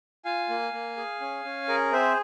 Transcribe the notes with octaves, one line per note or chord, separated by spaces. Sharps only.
F4 F5 G#5
A#3
A#3
G#4
C#4
C#4
G#4 A#4
C4 C5 E5